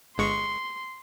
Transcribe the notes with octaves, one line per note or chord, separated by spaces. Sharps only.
G1 G#3 C6 C#6